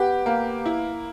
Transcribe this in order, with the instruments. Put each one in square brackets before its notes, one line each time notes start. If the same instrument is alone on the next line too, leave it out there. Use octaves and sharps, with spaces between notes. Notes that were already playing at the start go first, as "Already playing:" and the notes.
Already playing: [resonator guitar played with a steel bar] B3 [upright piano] G4
[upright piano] A#3
E4